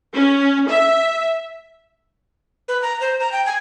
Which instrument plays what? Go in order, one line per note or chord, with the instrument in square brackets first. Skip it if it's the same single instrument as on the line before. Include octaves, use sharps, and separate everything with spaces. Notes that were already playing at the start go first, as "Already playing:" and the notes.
[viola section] C#4
E5
[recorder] B4
A#5
C5
A#5
G5
G#5